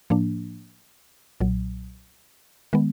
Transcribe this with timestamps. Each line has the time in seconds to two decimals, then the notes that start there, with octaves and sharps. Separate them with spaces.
0.10 A2 F3 A#3 D4
1.40 B1 A#2 F#3
2.73 D#3 G#3 B3